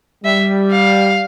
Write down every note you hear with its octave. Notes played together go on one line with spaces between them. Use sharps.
G3 E5
F5